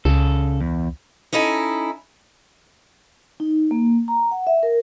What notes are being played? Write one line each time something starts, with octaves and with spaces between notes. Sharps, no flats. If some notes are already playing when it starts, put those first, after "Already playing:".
C#2 C#3 A4
E2
C#4 D#4 E4 A4 G#5
D#4
A#3
A#5
F#5
E5
A#4